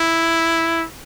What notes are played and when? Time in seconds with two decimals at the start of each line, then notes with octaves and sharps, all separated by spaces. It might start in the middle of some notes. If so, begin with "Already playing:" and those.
Already playing: E4